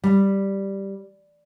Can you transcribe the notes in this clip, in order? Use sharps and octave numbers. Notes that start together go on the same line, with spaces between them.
G3